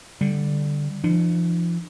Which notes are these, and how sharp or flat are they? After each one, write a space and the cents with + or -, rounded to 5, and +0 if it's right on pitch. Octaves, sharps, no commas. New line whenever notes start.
D3 +0 G3 +0
F3 -35 D4 +45